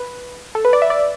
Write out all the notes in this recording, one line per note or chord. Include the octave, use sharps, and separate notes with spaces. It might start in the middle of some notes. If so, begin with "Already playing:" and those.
Already playing: B4
A4
B4
D5
E5
D5